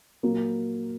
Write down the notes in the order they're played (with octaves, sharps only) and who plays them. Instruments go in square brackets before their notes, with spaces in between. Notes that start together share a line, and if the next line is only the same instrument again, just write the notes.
[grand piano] A#2 F#3 A#3